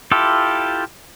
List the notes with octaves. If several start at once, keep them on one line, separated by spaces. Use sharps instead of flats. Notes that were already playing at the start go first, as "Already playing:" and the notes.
E4 F4 G4 A4